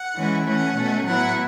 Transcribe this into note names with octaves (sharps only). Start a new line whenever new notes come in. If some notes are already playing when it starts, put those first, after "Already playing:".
Already playing: F#5
E3 G#3 C#4 E4
E3 A3 C#4 F#5
B2 A3 C#4
A2 F#3 B3 E4 F#5